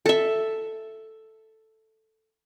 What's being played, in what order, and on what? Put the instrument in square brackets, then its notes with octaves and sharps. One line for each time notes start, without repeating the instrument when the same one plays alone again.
[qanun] A4 E5